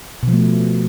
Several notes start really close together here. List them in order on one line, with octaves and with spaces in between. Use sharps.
B2 F3 A3